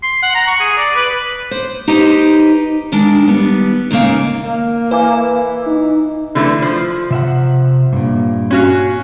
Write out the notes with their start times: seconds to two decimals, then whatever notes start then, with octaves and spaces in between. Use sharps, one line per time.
0.03 C6
0.23 F#5
0.35 A#5
0.47 C#6
0.60 G#4
0.77 D5
0.96 B4
1.51 C5
1.88 D#4 G4 B4 C5 D#5
2.92 D#3 G#3 D4
3.27 G3 B3
3.91 D#2 G#2 C#3 A#3 F5
4.44 A#3
4.91 E3 B4 G#5 D6
5.66 D#4
6.35 D3 E3 A3
6.62 F3
7.11 C3 E5 F#5
7.93 G2 A#2
8.50 C#4 F#4 F5